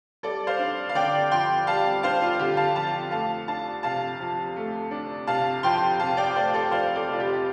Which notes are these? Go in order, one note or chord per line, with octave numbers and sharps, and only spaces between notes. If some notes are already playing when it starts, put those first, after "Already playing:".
G3 A4 D5
C5 F5
D4
F5
D3 D5 G5
F2 G5 C6
G3 F5 A5
D4 C5 F5
F4
D3 G4
F5 A5
F2 F5 A5
A3 F5 A5
D4 F5 A5
C3 F5 A5
F2
A3
D4
C3 F5 A5
F2 G5 C6
C3 F5 A5
D5 G5
A3 C5 F5
A4 D5
F2 C5 F5
A4 D5
F1 F4
G4